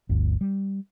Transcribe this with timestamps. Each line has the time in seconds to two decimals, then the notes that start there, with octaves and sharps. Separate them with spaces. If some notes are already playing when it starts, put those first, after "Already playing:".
0.09 G1 D2
0.41 G3